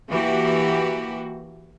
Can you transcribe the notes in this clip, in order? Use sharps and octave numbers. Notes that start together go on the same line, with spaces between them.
E3 A#3 F#4 G4